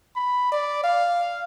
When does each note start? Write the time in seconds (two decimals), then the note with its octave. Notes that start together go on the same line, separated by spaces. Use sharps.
0.16 B5
0.52 D5
0.84 F5